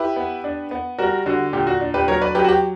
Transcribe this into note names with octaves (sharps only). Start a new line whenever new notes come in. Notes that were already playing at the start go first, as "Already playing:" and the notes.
Already playing: E4 G4 B4
B3
D4
B3
G3 F#4 A#4
D3 F#4
A#2 G4
F#4
D4
G4 B4
F#3 A#4 C#5
B4 D5
F#3 G4 B4
F#4
G4